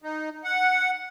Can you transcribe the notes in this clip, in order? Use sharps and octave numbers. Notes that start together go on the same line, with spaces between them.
D#4
F#5